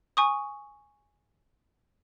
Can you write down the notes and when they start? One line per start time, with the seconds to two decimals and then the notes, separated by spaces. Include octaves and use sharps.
0.17 G#5 C#6 D#6